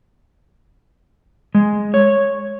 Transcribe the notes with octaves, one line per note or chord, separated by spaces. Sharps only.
G#3
C#5